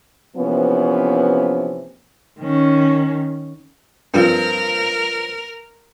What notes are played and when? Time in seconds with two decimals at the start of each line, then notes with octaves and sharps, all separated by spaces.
0.37 C3 E3 F3 A#3 B3 C#4
2.40 D#3 C#4
4.14 G2 F3 C4 A#4